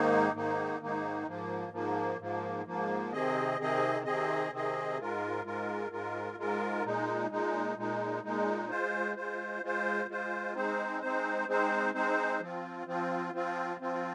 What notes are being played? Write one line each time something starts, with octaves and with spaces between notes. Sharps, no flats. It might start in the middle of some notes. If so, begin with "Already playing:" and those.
Already playing: G#2 D#3 A#3 D#4
G#2 D#3 A#3 D#4
G#2 D#3 A#3 D#4
G#2 F3 A#3
G#2 F3 A#3
G#2 F3 A#3
G#2 F3 A#3
C3 D#3 C4 G#4 D#5
C3 D#3 C4 G#4 D#5
C3 D#3 C4 G#4 D#5
C3 D#3 C4 G#4 D#5
G#2 G#3 F4 A#4
G#2 G#3 F4 A#4
G#2 G#3 F4 A#4
G#2 G#3 F4 A#4
A#2 G#3 D#4
A#2 G#3 D#4
A#2 G#3 D#4
A#2 G#3 D#4
G#3 F4 C5
G#3 F4 C5
G#3 F4 C5
G#3 F4 C5
G#3 C4 D#4 C5
G#3 C4 D#4 C5
G#3 C4 D#4 C5
G#3 C4 D#4 C5
F3 C4 F4
F3 C4 F4
F3 C4 F4
F3 C4 F4